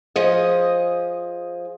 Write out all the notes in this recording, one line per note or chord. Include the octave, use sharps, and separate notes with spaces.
F3 G#4 D#5